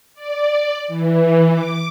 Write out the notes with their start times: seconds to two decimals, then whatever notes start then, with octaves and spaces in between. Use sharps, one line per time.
0.14 D5
0.88 E3
1.51 D6